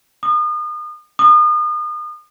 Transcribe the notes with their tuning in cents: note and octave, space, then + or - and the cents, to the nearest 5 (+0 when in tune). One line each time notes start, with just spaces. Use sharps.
D#6 -35
D#6 -35